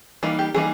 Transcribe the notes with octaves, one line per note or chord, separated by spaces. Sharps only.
E3 G3 A#3 D#4
G4
E3 G3 A#3 D#4 G#4